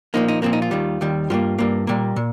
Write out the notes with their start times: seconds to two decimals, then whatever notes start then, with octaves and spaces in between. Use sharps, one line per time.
0.14 A#2 F3 A#3 D#4
0.28 D#4
0.42 A#2 F3 A#3 C4
0.53 D#4
0.62 F4
0.71 D#2 D#3 G3
1.01 D#2 D#3 G3
1.30 G2 G3 A#3 F4
1.59 G2 G3 A#3
1.87 A#2 G3 A#3
2.16 A#2